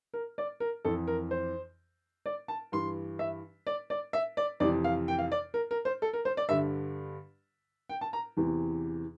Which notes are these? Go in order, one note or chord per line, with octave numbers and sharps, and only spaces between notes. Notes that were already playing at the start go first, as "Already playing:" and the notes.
A#4
D5
A#4
F2 E3 A4
A#4
C5
D5
A5
G2 E3 C6
E5
D5
D5
E5
D5
F2 C3 E3 D5
F5
G5
F5
D5
A#4
A#4
C5
A4
A#4
C5
D5
G2 D3 E5
G5
A5
A#5
E2 C3 E3